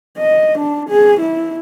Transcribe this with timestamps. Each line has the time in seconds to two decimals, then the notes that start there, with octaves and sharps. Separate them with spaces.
0.18 D#5
0.59 D4
0.89 G#4
1.20 E4